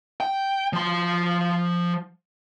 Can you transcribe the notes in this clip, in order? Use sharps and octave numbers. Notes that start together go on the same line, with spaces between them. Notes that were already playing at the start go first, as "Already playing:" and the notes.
G5
F3 C6